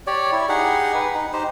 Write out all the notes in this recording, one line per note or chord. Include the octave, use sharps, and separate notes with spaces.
G4 C#5 D5
E4
D#4 G4 G#4 F#5
B4
D#4
D#4 G4 C5